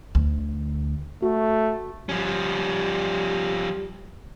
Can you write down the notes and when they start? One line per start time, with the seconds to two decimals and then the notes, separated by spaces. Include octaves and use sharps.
0.15 D2
1.22 A3 F#4
2.09 F3 G3 C#4